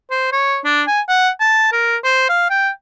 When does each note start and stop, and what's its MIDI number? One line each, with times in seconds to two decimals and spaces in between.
0.10 0.30 72
0.33 0.58 73
0.65 0.82 62
0.87 1.01 80
1.09 1.29 78
1.41 1.69 81
1.73 1.97 70
2.04 2.27 72
2.29 2.47 77
2.50 2.69 79